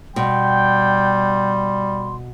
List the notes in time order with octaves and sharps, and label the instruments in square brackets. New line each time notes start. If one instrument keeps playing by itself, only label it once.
[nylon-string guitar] B2 [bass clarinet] G3 [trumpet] G5 [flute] C6